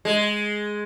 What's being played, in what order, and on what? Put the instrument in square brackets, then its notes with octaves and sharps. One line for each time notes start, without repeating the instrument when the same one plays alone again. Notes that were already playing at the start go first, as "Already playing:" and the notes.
[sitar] G#3